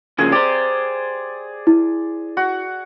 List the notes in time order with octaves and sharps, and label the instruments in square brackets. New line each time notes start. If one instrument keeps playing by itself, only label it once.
[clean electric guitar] C#3 F3 A#3 [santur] G#4
[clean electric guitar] G4 C5 [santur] D5
[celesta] E4
[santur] F#4